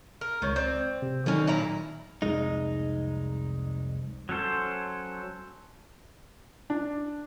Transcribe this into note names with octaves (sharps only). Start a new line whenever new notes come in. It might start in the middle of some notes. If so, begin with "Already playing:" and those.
A#4
C#2 D#3 C#5
C4 D5
C3
D3 D#3 F#3 C4 C#4 D#4
A#2 E4 A#5
C2 F2 G#3 D#4
F#3 C#4 A4 C5
D4